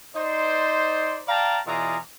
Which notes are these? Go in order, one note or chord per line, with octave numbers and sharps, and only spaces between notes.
D#4 C5 D5
D5 F5 G5 A5 A#5
B2 E3 F4 G#4 D5 A#5